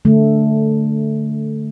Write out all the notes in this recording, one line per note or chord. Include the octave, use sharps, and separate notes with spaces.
D3 A3